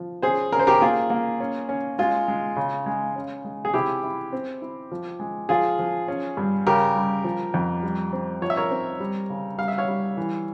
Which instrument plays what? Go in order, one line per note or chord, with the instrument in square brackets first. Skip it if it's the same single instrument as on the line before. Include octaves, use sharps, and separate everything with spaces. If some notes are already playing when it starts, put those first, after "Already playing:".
Already playing: [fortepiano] F3
C#4 G#4 C5
C#4 A#4
C5
G4 A#4
A#3 F4 G#4
A#3
C#4
C#4
G#3 F4
G#3
C#3
G#3
C#4
G#3
G#4
C3 E4 G4
E4
C4
E4
F3
G#3
F3 F4 G#4
F3
C#4
G2
C#3 G4 A#4
G3
F3
F2
G3
C4
F3 C#5
E5
A#4 C#5
C4
G3
C#3
G3 F5
E5
C#5 F5
G3
E3